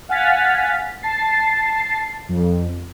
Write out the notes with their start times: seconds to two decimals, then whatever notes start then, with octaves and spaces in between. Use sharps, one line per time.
0.09 F5 F#5 G#5 F6 A6 B6
1.02 A5 A6 C7
2.29 F2